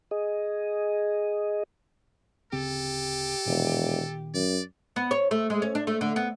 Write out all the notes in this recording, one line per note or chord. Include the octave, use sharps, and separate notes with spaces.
G#4 D#5
D1 C#3 C4 G4 A4
E1 A#2 D#3 B3
F#2 D5
B3
C#5
A3
G#3
C#4
D4
A3
D3
B3